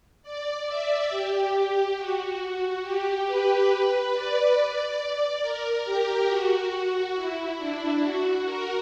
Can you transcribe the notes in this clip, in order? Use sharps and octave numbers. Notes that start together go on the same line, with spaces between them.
D5
E5
G4
F#4
G4
B4
B4
D5
D5
A#4
G4
F#4
E4
D4
F#4
A#4